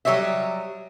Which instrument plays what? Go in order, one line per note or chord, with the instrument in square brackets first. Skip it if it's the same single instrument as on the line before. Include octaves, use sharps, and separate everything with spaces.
[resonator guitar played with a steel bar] F#3 G3 C#5 D#5 E5